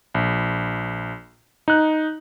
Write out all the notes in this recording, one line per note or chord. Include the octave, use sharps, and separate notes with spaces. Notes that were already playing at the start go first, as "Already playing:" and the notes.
A#1
D#4 F#6